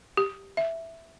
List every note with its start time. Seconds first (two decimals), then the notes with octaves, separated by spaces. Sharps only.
0.17 G4
0.57 E5